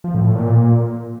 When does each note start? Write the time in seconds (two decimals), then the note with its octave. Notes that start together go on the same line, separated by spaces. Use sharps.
0.04 F3
0.14 A2
0.25 A2
0.35 A#2